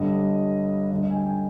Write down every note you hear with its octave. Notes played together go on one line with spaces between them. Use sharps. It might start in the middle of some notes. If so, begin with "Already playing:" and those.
Already playing: G1 G2 D3 G3 D#5
D2 D3 G3 D#5
D#5
G#5
G5
G#5